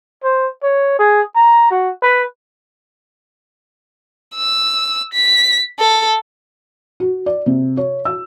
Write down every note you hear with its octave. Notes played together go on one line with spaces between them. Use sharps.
C5
C#5
G#4
A#5
F#4
B4
E6
B6
A4
F#4
D5
C3
C#5
E6